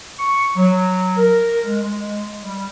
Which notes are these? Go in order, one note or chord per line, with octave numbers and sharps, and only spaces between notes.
C#6
F#3
A#4
G#3
G#3
G3